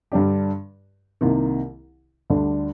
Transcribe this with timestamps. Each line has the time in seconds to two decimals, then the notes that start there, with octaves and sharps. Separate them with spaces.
0.12 G2 D3 G3 D4 G4
1.21 C2 C3 D#3 A#3
2.30 D2 D3 G3 D4